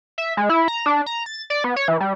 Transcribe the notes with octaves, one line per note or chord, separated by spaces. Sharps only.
E5
G#3
E4
A#5
D4
A#5
A6
D5
B3
C#5
E3
G3